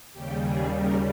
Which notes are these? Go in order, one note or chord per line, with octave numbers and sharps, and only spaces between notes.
D#2 C#3 G3 G4
G#4
A#4